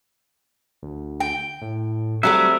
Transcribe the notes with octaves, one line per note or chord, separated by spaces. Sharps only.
D2
G5
A2
F#3 G3 A3 C4 E5